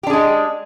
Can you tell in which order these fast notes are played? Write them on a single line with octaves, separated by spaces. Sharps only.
G4 D4 G#4 G#3